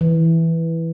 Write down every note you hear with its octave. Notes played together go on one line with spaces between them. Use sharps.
E3